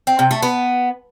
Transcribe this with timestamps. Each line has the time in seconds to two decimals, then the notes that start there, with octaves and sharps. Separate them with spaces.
0.07 C4
0.19 C3
0.31 A3
0.43 B3